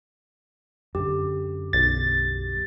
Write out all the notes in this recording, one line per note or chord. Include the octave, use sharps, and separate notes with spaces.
F#2 D3 G4
B1 A6